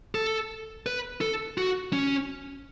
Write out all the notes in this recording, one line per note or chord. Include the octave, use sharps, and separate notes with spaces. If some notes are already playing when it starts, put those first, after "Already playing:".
A4
B4
A4
F#4
C#4